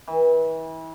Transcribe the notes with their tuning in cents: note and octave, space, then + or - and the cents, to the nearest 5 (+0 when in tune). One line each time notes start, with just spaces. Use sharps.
E3 -30